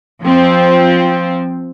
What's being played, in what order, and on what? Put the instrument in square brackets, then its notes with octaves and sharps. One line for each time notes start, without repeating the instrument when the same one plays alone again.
[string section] F3 C4